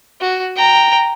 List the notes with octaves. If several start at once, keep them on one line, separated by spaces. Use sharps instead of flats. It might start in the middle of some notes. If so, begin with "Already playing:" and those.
F#4
G5 A#5